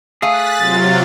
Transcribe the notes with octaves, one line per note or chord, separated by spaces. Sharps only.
A3 G#4 F5 F#6 A6 B6
C3 F#3 F4 A6